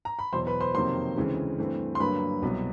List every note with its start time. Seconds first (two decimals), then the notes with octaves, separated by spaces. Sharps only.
0.05 A#5
0.19 B5
0.32 E2 B2 F#3 C5 C6
0.47 B4 B5
0.60 C5 C6
0.74 F2 C3 D#3 F#3 A#3 C5 C6
1.16 D2 C#3 E3 G#3 C4
1.59 G2 E3 A3 C4
1.95 C6
2.00 G2 D3 F#3 A#3 B4 B5
2.42 C2 B2 F#3 B3